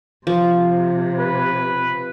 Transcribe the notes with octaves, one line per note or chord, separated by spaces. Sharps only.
C3 F3
B4